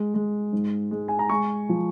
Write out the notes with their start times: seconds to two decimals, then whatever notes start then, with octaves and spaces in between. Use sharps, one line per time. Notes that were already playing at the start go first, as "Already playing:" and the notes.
Already playing: G#3
0.14 G#3
0.53 G#2
0.91 G#3
1.08 G#5
1.19 A#5
1.29 G#3 G#5 C#6
1.69 F3